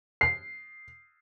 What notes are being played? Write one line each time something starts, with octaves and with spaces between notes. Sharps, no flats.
C7